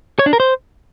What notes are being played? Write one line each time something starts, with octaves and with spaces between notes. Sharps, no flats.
C#5
D4
A#4
C5